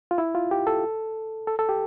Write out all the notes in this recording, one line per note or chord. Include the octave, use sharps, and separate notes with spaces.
F4
E4
F4
G4
A4
A4
A4
G4